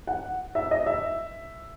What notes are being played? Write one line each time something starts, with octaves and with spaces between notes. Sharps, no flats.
F#5
E5
D#5
E5